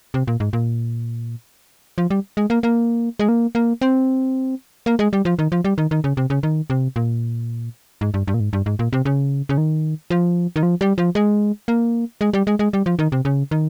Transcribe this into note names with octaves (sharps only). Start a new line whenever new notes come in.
C3
A#2
G#2
A#2
F3
G3
G#3
A#3
A#3
G#3
A#3
A#3
C4
A#3
G#3
G3
F3
D#3
F3
G3
D#3
D#3
C#3
C3
C#3
D#3
C3
A#2
G#2
G2
G2
A#2
G#2
G2
G#2
A#2
C3
C#3
C#3
D#3
F3
D#3
F3
G3
F3
G#3
A#3
G#3
G3
G#3
G#3
G3
F3
D#3
C3
C#3
D#3